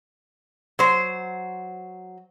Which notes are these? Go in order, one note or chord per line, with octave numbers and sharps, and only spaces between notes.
F#3 C5